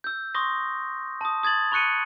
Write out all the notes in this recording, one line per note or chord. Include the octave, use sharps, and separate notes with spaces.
E6 G6
C6 C#6 D#6 A#6
A5 D#6
D#6 G#6 A6 F#7
B5 C#6 F#6 C#7 D#7